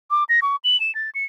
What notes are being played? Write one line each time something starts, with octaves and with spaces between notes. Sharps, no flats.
D6
A#6
C#6
F#7
E7
A6
C#7